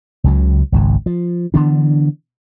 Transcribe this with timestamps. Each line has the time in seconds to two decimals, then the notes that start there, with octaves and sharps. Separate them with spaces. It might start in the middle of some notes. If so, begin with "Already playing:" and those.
0.24 C#2 C#3 F#3
0.72 G#1 C#2 G#2
1.06 F3
1.54 D3 E3 B3 D4